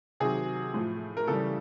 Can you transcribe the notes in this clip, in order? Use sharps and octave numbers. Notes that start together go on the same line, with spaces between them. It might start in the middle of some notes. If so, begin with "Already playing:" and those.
C3 D#3 F#3 G#4
A2 F3
A#4
C#3 E3 G3 A4